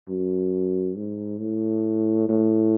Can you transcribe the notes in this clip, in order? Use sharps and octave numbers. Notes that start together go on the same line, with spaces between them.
F#2
G#2
A2
A2